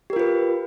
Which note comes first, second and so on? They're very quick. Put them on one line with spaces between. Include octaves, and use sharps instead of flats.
G4 A#4 F4 B4